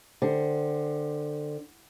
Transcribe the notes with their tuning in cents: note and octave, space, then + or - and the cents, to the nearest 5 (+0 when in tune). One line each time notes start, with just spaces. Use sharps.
D3 +20 C4 +10